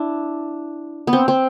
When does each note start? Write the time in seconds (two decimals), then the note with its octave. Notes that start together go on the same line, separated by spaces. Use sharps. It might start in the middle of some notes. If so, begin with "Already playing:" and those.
Already playing: D4 E4
1.07 B3
1.13 C4
1.28 C4